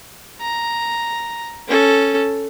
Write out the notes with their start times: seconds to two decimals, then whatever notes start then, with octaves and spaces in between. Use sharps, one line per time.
0.41 A#5
1.68 C#4 A4